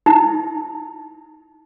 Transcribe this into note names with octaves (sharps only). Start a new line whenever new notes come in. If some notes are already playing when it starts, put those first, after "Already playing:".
D#4 E4